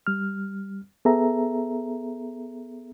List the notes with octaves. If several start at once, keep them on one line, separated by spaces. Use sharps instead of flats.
G3 F6
B3 G#4 A4 E5 A#5